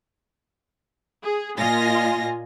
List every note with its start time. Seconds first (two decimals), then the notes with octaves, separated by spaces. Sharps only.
1.23 G#4
1.57 A#2 F4 D#5 G#5 A#6